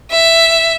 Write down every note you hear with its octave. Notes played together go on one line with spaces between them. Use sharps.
E5